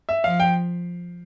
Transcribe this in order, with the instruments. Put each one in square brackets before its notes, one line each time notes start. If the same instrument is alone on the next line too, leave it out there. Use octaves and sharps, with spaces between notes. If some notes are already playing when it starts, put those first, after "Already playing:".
[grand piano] E5
[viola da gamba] F3 [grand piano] F5
[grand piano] G5